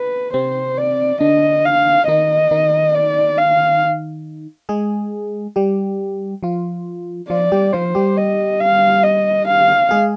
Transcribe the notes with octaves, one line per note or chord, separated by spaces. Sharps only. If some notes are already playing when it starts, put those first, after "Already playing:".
Already playing: B4
C3 C4 C5
D5
D3 D4 D#5
F5
D#3 D#4 D#5
D#3 D#4
D5
F5
G#3 G#4
G3 G4
F3 F4
F3 F4 D5
G3 G4
F3 F4 C5
G3 G4
D#5
F5
D#5
F5
G#3 G#4